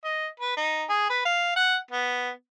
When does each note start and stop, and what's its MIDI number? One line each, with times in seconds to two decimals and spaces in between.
0.04 0.28 75
0.40 0.56 71
0.57 0.84 63
0.89 1.09 68
1.10 1.23 71
1.25 1.55 77
1.56 1.77 78
1.91 2.30 59